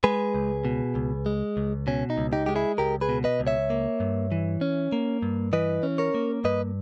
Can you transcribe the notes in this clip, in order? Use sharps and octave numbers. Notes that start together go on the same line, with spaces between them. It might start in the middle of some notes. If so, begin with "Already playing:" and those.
G#3 G#4 B4
C#2
B2
C#2
G#3
C#2
B2 C#4
D#4
C#2
D#4 G4
G#3 G4
E4 G#4
C#2 G4 A#4
G#4 B4
B2
B4 D#5
C#2
C#5 E5
A#3
G2
E3
C#4
A#3
G2
E3 B4 D#5
C#4
A#4 C#5
A#3
G2 B4 D#5